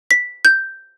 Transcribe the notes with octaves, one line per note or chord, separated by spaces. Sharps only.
B6
G6